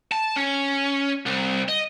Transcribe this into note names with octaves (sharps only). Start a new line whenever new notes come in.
A5
C#4
C2
D#5